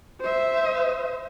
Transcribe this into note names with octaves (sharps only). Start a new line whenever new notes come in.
C5 E5